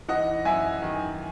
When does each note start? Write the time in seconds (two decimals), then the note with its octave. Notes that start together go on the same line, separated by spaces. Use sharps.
0.08 E3 D#5 F#5
0.45 F#2 E5 G#5
0.82 D#3